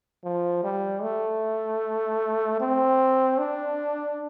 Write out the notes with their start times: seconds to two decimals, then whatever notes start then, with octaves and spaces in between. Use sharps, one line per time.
0.24 F3
0.63 G3
1.03 A3
2.60 C4
3.39 D4